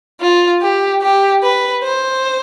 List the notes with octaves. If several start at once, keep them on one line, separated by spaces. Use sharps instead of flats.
F4
G4
G4
B4
C5